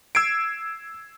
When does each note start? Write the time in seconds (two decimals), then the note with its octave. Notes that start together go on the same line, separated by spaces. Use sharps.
0.15 E6 G#6 C7 D7